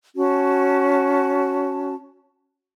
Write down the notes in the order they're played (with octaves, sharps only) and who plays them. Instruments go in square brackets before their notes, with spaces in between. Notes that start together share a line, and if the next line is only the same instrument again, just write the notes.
[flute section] C#4 F#4 A5